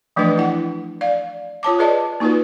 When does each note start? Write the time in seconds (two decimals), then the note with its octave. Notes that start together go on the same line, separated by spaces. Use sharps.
0.16 E3 F3 A3 D4 B4 D#5
0.38 E4 F#5
1.01 D5 F5
1.63 F4 C#5 A5 D6
1.79 G#4 B4 D5 D#5 A5
2.20 A#3 D#4 F4 F#4 B4